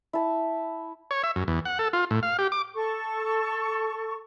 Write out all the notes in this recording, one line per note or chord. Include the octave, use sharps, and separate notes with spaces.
E4 A5
C#5
E5
F#2
E2
F#5
A4
F4
A2
F5
G4
D6
A4 C#6